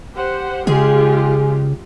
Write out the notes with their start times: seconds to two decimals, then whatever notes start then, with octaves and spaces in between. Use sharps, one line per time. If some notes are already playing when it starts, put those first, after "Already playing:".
0.13 G4 C5 F#5
0.67 C#3 G#3 F4 G4 G#4